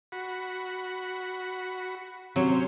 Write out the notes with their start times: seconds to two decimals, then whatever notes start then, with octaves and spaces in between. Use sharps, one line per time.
0.12 F#4 B5
2.36 C3 F#3 C#4 C5